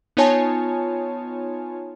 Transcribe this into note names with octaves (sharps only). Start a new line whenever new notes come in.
B3 D#4 F4 C#5 G#5 A5